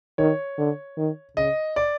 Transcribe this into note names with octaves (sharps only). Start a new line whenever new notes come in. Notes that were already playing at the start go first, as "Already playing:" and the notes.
D#3 C#5
D3
D#3
C#3 D#5
D5